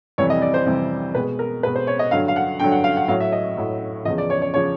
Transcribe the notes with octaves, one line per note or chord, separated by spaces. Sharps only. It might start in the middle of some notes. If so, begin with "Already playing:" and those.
F2 C3 E3 G3 C#5
D#5
D5
C5
F2 C3 E3 G3
B2 G#3 B4
A#4
B2 G#3 B4
C5
C#5
D#5
G2 D3 F#3 F5
F5
F#5
G2 D3 F#3 G5
F#5
F5
F#5
A2 F#3 F5
E5
D#5
A2 F#3
E2 C#3 F3 D#5
D5
C#5
C#5
C#3 F3 C#5